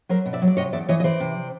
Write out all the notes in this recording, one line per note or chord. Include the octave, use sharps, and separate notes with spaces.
F#3 A#4 C5
B2
D5 E5
F#3
D5
C3 C#5 D#5
E2 D5 E5
E3 C#5 D#5
D#5
E3 C5 D5
C3